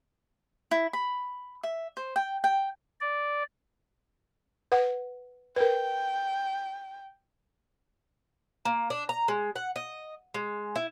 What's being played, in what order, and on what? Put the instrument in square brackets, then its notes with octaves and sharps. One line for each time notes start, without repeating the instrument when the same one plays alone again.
[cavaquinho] E4
B5
E5
C5
G5
G5
[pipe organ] D5
[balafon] B4 F#5
[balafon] A#4 B4 [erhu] G5
[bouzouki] A#3
D4
A#5
G#3
F#5
D#5
G#3
E4